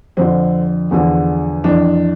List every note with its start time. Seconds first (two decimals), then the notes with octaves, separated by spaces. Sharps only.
0.17 F2 D3 F3 C4
0.91 E2 D3 F3
1.64 F2 E3 D4